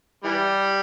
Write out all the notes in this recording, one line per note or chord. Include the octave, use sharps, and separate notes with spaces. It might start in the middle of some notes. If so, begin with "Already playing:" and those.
E3 G3